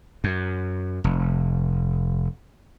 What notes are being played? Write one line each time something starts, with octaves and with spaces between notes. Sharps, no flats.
F#2
F1